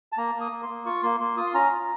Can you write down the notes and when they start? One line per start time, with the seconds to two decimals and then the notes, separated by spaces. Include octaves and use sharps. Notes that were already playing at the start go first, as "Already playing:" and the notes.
0.12 A5
0.18 A#3 A#5
0.35 A#3
0.41 D#6
0.52 A#3
0.63 C6
0.69 A#3
0.86 F4 C#6
1.03 A#3 C6
1.20 A#3 C6
1.37 F4 D#6
1.47 C6
1.54 C#4 A#5
1.71 F4